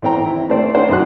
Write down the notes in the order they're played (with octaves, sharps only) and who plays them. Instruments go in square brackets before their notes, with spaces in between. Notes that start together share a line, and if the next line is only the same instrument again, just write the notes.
[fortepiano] A1 B3 C4 G5 A#5
D#3 E4
A3 C4 C5 D5
C4 D4 D#4 C5 C#5 F#5
F#2 B2 D#4 E4 F#4 F#6